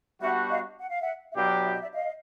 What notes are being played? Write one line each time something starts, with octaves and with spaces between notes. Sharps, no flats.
G3 B3 D4 F#4 E5 F#5
D#5 F5
F#5
F5
E5 F#5
E5
B2 F#3 B3 D4 G4 D#5 F5
E5
D#5
D5 E5
D#5 F5